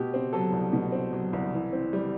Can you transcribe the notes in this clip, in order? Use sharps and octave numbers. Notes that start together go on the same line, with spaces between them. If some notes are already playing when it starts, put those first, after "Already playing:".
Already playing: B2 G4
C4
F#3 A4
C2
B2
C4
F#3
C2
E3
C4
G3